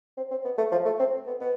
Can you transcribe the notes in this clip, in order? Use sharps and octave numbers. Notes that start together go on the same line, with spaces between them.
C4
C4
B3
A3
F3
A3
C4
B3
B3